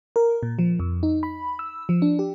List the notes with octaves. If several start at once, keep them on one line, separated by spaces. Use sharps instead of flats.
A#4
A#2
F3
F2
D#4
B5
E6
F3
D4
G4